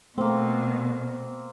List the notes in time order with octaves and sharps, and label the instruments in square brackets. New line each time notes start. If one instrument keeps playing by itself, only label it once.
[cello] B2 [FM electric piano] A3 [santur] A#3 C4